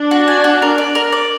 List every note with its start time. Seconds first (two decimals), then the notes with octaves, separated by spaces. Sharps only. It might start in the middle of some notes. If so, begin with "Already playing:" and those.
Already playing: D4
0.11 F#4
0.28 G#5
0.44 F#4
0.62 A#4
0.78 D5
0.95 A#4
1.12 D5